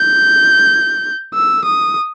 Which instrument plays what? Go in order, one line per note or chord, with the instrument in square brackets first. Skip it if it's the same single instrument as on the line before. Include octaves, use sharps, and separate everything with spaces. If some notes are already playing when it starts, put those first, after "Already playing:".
Already playing: [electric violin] G6
E6
D#6